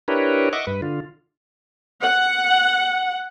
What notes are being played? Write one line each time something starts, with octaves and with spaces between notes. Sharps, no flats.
D4 E4 G4 A#4 B4 C#5
D#5 E5 F#5 C#6 D6
G2 B4
D3 F4
F#5